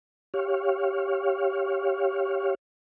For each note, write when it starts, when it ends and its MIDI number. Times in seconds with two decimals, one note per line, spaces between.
0.34 2.55 67
0.34 2.55 73
0.34 2.55 77